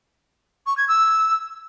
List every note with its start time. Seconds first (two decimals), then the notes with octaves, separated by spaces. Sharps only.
0.67 C#6
0.77 G#6
0.88 E6